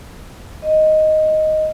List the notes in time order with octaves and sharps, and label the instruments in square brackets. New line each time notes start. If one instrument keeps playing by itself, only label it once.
[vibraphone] D#5